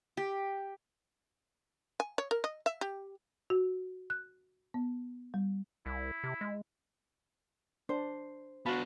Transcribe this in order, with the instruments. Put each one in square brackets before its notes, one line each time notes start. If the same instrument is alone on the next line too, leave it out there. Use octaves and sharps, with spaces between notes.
[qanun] G4
[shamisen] G#5
C#5
A#4
D#5
E5
G4
[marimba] F#4
F#6
B3
G3
[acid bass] C2 [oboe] E4
[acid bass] C3
G#3
[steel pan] D4 [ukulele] C5
[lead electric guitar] B3 D4 [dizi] F#4 [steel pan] F5 A5 B5